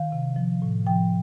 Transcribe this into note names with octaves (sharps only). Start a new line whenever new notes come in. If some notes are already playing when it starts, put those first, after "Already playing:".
Already playing: D#3 F5
C3
F3
A2
F3 G5